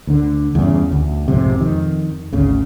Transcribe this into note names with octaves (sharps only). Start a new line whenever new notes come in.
D2 D3
E2 G2 C#3
D2
B1 F2 G#2 C3
F2 D#3
G#1 D2 C#3